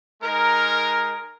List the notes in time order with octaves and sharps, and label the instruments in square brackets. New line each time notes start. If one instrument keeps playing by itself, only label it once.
[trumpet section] G#3 D#4 A#4